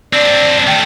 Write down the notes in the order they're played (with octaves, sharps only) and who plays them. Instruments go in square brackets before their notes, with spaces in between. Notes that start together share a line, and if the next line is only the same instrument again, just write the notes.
[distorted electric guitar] C4 D4 [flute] D5
[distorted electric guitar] D#3 A3 [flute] G5